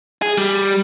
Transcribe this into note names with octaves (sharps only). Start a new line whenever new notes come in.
G#4
G3